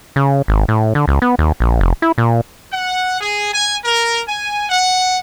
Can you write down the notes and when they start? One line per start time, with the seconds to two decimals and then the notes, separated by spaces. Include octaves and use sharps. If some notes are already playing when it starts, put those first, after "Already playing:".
0.16 C#3
0.48 G#1
0.68 A2
0.95 D3
1.08 C#2
1.22 B3
1.39 D#2
1.60 A#1
1.80 F1
2.02 E4
2.18 A#2
2.71 F#5
3.19 G#4
3.54 G#5
3.85 A#4
4.29 G#5
4.70 F#5